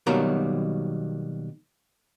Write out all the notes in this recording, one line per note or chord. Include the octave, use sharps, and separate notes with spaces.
B2 D#3 F#3 G3 A#3 A#5